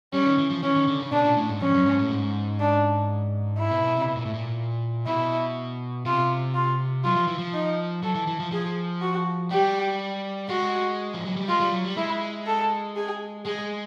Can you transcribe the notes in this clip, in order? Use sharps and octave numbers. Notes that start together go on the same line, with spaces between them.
G3 C#4
D#3
E3
F3
E3 C#4
D#3
D3
C#3
B2 D4
A#2
A2
G#2
F2 C#4
F#2
G#2
A2
G#2
D4
E4
B2
B2
C3
B2
A#2
A2
A#2
B2 E4
C3 F4
F4
F#3 F4
F3
E3
F3
D#4
F#3 A4
E3
E3
F3
F3 G#4
F#4
G3 G4
G#3 F#4
F3
F#3
G3
G#3 F4
G3
F#3
G3
G#3 E4
A4
G#4
G#3 G#4